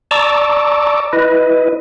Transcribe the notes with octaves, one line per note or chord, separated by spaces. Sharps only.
D5 A5 A#5 C#6 D6 E6
E4 B4 D#5